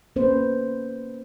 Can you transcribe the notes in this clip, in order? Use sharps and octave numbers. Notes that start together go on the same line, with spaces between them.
A#3 C#4 B4 C5